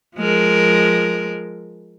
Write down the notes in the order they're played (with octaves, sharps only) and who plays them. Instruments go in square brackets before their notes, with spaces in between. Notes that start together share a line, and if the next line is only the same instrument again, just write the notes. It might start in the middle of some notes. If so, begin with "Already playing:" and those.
[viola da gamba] F3 G#3 A#4